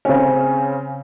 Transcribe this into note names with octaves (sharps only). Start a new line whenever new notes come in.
C#3 C4 C#4